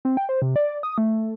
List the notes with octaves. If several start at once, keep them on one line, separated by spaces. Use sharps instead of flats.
C4
G5
C5
C3
D5
D#6
A3